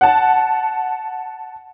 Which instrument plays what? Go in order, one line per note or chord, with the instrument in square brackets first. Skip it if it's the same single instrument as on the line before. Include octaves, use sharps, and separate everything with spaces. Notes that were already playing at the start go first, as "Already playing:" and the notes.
[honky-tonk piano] F#5 A5